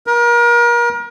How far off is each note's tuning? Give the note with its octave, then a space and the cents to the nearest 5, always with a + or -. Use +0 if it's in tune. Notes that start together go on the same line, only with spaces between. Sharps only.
A#4 +35